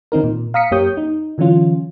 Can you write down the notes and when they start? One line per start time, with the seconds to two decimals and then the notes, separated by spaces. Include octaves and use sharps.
0.12 D#3 C4 D#4 A#4
0.24 A#2
0.54 F5 A#5 D#6 B6 C#7
0.71 F#2 A#3 G4 C#5 D#6 G6
0.97 D#4
1.38 D3 E3 F#3 C#4 F4